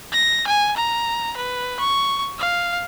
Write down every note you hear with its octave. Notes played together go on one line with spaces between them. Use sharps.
A#6
G#5
A#5
B4
C#6
F5